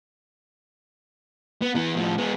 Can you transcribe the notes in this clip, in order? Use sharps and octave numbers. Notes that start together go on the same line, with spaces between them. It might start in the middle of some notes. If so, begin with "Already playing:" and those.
B3
E3 B3
A2 F3
G#3 B3